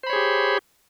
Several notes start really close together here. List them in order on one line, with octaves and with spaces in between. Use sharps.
C5 B5 C#5 G#4 G4